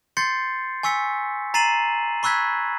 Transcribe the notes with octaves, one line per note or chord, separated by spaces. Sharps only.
C6 G6 A6 C7 C#7
G#5 C#6 E6 B6 C#7
A#5 A6 C7 D#7 E7 F#7
B5 C#6 E6 F#6 G#6 B6